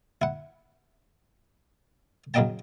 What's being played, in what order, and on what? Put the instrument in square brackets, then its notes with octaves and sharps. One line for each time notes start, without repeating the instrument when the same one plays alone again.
[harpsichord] E4 F#5
C#3 F#3 D#4 D#5 G5 A5